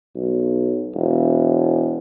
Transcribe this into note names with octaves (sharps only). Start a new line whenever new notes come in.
B1
E1